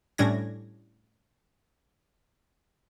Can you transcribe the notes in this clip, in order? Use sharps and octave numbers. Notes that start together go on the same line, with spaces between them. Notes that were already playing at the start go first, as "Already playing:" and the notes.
A2 G3 C#4 D4 G#6 A#6